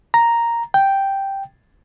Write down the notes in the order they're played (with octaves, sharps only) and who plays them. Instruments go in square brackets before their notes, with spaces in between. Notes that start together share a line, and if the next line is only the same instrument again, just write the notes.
[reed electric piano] A#5
G5